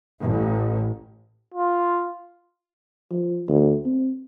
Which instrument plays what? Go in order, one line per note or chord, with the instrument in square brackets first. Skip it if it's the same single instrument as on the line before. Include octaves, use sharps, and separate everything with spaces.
[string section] A1
[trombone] F4
[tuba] F3
D2
C4